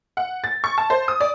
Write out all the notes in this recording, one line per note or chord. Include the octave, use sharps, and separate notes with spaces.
F#5
A6
C#6
A5
C5
D#6
D5